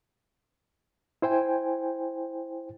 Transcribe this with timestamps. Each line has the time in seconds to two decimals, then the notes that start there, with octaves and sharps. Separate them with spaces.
1.22 E4 C5 G5 G#5